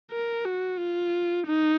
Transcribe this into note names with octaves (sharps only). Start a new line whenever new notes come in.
A#4
F#4
F4
D#4